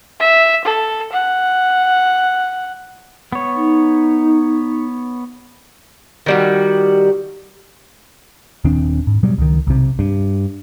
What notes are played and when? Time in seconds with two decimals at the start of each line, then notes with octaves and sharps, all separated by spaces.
0.20 E5
0.65 A4
1.12 F#5
3.32 B3 C#5
3.55 D#4
6.26 D#3 G3 F#4
8.65 D#1 D#3 C4 D4
9.07 G#2
9.23 B2 F#3 G3
9.38 C#2 D#3
9.67 B1 C3
9.99 G2